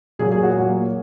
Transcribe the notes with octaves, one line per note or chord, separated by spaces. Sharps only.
A#2 F#3 A#3 G#4
G#4
F#4
A#2 F#3 A#3